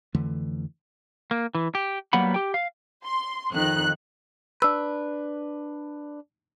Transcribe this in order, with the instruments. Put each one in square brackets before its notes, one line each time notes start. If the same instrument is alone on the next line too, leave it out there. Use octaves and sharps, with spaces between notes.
[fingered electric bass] F2 D3 E3 A3
[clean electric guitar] A#3
E3
G4
F#3 G3 A#3 B3 F#5 B5
G4 G5
F5
[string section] C6
F2 D#3 F#6
[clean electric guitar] D4 B4 [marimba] E6